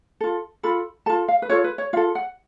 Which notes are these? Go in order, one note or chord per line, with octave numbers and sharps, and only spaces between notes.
F4 A4
F4 A4 B5
F4 A4 A5
F5
B4
F4 A4 C#5
B4
C#5
F4 A4 F5
F#5